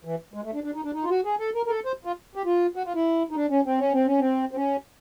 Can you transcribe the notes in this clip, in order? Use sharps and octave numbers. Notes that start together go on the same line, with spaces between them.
E3
G#3
A3
D4
D4
D#4
D4
D#4
F4
F#4
G#4
A4
A#4
A#4
A4
C5
F4
G4
F4
F#4
F4
E4
D#4
D4
C#4
C4
C#4
C4
C#4
C4
C4
C#4